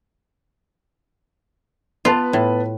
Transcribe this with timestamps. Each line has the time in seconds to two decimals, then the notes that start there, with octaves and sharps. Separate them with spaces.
2.05 B3 F4 B4 A5
2.33 A2